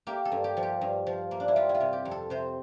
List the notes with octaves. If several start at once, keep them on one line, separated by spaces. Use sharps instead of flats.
A#3 G4
A4
G2
G4
F3
G4
G2
F3
A#3
D4
E4
G3 F4
E4
F4
C3
G4
F2
A4
C3 C5